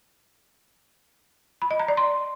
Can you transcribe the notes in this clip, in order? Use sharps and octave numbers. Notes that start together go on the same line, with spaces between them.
B5
D#5
A#5
D5
C6